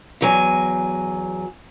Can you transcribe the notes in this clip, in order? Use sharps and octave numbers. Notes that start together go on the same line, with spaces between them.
E2 F#3 G#5